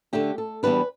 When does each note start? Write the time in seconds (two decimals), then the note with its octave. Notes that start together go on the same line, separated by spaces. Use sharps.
0.13 D3 A3 D4 G4
0.38 A4
0.63 E2 E3 G3 B3 D4 B4